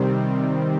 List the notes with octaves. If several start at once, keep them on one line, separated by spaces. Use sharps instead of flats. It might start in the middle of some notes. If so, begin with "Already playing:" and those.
Already playing: C3 D#3 G3 C4